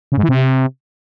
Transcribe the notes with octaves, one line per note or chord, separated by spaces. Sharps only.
C#3
G#2
E3
C3